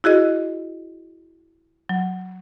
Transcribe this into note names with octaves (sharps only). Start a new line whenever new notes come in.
E4 F#4 G#4 D#5
F#3